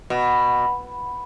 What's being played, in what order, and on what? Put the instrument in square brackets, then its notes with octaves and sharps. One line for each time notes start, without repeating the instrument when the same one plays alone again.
[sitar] B2